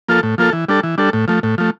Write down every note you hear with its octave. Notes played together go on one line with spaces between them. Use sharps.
F3 A#3 F4 A4
A2
F3 A#3 F4 A4
E3
G3 D4 A4
E3
G3 D4 A4
A2
F3 A3
A2
F3 A3